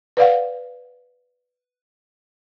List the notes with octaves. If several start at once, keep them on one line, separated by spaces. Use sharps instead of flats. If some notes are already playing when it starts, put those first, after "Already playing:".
B4 D5 F5 F#5